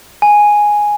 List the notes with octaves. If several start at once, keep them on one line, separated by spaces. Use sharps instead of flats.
G#5